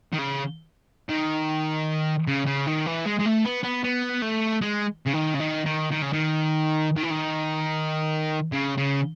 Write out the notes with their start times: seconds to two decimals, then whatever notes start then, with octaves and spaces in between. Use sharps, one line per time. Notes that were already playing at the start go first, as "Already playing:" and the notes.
0.13 D#3
0.18 C#3
1.09 D#3
2.28 C#3
2.46 C#3
2.66 D#3
2.86 E3
3.06 G#3
3.19 G#3
3.25 A3
3.45 B3
3.63 B3
3.84 B3
4.22 A3
4.61 G#3
5.06 C#3
5.14 D#3
5.35 C#3
5.40 D#3
5.65 D#3
5.91 D#3
6.02 C#3
6.13 D#3
6.96 D#3
7.03 E3
7.10 D#3
8.52 C#3
8.77 C#3